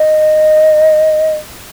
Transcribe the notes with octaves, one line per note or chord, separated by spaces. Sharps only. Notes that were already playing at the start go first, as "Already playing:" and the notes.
Already playing: D#5